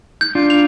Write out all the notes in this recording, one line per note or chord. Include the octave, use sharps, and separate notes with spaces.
G6
D4 F4
F7